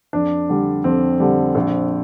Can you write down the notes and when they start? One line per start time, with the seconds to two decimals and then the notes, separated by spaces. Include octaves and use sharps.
0.13 F2 D4
0.49 D3 G3
0.84 F2 C4
1.20 D3 G3
1.55 A#1